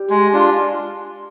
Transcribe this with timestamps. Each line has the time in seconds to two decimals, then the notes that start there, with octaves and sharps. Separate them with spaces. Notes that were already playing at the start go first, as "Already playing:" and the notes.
Already playing: G3
0.10 G#3
0.33 D4 F4